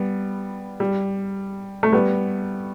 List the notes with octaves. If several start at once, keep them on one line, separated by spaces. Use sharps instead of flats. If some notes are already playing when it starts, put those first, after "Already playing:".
Already playing: G3 B3
G3
A3
G3 B3